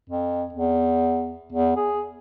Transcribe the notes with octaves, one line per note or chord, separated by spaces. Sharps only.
F2
E2
E2
G#4